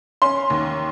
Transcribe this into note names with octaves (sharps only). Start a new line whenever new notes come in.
C#4 C6
D#2